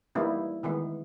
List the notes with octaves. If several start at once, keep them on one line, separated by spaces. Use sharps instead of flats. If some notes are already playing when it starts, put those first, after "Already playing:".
E3 G3 A#3 B3 D#4 E4
D#3 E3 G#3 B3